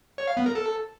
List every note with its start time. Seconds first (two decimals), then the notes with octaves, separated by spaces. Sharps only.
0.18 C#5
0.27 F5
0.37 B3
0.46 A#4
0.55 A4